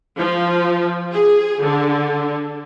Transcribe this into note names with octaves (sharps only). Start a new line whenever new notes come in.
F3
G#4
D3